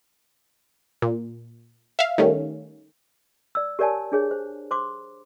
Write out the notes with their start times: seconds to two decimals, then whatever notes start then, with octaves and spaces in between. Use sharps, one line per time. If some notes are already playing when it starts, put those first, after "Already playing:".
1.02 A#2
1.99 E5 F5
2.18 D#3 G3 A3 C#4
3.55 D5 E6
3.79 G4 A#4 C#5 D5 G#5 A5
4.12 D4 G#4 C#5
4.31 C5
4.71 C5 C6 D6